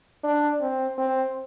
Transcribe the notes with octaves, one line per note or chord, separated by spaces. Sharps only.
D4
C4
C4